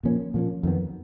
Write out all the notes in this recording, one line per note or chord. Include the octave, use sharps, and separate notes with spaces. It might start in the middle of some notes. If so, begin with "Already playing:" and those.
A#2 F3 A#3 C#4
A#2 F3 A#3 C#4
F2 D#3 F#3 B3